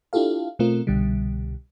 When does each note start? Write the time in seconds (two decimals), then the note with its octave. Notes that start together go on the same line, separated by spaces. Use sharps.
0.13 D4 E4 F4 G4 A4 F5
0.59 B2 A3 C4 F4 A#4
0.87 C2 B2 D3 G3